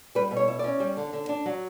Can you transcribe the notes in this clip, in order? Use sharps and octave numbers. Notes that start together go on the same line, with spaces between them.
G3 B4
B2
C#5
E4
C#4 D5
G3
D3
D3
D4
F#3